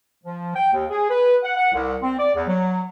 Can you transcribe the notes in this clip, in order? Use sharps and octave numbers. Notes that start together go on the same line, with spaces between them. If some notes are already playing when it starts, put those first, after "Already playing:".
F3
G5
D#2
G#4
B4
F#5
F#5
C2
C4
D5
E2
F#3